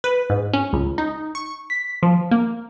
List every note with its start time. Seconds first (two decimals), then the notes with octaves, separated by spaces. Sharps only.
0.04 B4
0.30 G#2
0.54 C#4
0.73 C#2
0.98 D#4
1.35 C#6
1.70 B6
2.03 F3
2.31 A#3